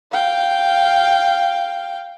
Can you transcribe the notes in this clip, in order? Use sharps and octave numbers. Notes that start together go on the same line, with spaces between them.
F5 G5